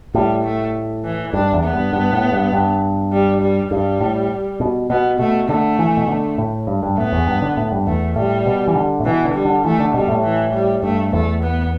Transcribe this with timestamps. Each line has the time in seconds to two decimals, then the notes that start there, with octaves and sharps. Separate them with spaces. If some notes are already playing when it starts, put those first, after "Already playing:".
0.14 A2 G3
0.44 A3
1.04 E3
1.33 G2 D4
1.53 E2
1.63 B3
1.73 G2
1.93 G2
2.13 A2
2.32 G2
2.52 G2
3.12 G3
3.41 G3
3.71 G2 G3
4.01 A2
4.60 B2
4.90 B2 B3
5.19 B2 A3
5.49 D3 A3
5.79 E3
5.97 B2
6.08 D3
6.38 A2
6.67 G2
6.83 G2
6.98 A2 B3
7.12 E2
7.27 G2
7.42 D3
7.57 A2
7.72 G2
7.87 E2 A3
8.15 A2 G3
8.46 B2
8.68 E3
8.76 D3
9.00 A2
9.05 B2 E3
9.24 D3
9.34 G3
9.45 D3
9.65 E3 A3
9.80 D3
9.94 B2 G3
10.08 A2
10.23 E3
10.53 G3
10.83 G2 A3
11.13 E2 A3
11.43 B3